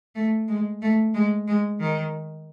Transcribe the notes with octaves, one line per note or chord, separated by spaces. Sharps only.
A3
G#3
A3
G#3
G#3
D#3